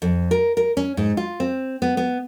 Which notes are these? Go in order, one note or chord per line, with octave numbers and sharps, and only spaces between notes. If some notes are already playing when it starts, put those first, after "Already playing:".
F2
A#4
A#4
C#4
G#2
F4
C4
B3
B3